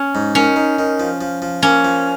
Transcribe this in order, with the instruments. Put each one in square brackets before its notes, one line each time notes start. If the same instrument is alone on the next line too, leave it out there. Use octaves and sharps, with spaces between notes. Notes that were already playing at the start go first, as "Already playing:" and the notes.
Already playing: [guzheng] C#4
[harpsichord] G#2
[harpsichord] D#3 [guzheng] C#4
[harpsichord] D#3
D#3
F3
F3
F3
[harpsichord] A#3 [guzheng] C#4
[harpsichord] F3